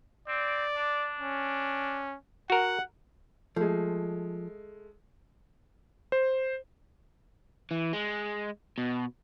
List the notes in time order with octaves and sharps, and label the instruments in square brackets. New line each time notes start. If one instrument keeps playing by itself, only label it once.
[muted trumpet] C4 [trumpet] D5
[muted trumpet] D4
[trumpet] C#4
[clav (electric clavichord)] F#4 A#4 [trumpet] F#5
[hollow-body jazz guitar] F3 [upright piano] G#3 A3
[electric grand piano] C5
[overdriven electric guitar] E3
G#3
B2